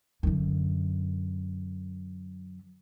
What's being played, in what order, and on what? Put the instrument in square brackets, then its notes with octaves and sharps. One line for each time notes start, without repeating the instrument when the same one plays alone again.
[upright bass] F#2 D3